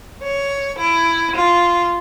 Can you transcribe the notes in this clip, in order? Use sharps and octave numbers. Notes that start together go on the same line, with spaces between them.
C#5
E4
F4